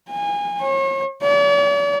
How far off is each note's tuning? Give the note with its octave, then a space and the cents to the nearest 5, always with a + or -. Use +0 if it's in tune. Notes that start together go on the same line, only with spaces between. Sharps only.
G#5 -25
C#5 -40
D5 -45